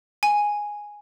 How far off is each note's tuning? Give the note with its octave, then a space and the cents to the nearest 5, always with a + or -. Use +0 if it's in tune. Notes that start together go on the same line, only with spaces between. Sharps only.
G#5 -5